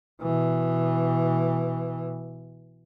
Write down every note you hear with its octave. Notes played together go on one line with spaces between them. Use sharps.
B2 E3